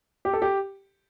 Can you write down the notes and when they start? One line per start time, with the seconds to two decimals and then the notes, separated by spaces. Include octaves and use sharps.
0.25 G4
0.33 A4
0.42 G4